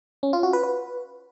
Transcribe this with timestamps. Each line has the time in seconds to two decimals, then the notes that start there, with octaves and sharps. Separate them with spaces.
0.23 C#4
0.33 F4
0.43 F#4
0.53 B4
0.63 B4